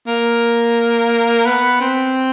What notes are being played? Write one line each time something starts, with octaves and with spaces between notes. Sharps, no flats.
A#3
B3
C4